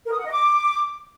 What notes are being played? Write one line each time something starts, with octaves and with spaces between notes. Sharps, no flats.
A#4
D#6
F#5
D#5
D6